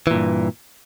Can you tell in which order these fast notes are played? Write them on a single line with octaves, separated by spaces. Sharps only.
E3 A#2 G2